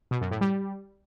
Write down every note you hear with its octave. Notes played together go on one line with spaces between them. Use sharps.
B2
F#2
A2
G3